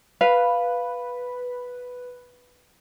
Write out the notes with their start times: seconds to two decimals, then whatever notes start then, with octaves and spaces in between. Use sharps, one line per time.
0.21 B4 F5